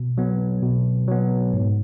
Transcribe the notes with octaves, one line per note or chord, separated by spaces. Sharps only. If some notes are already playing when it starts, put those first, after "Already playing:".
Already playing: B2
F#3 B3
B2
F#3 B3
G#2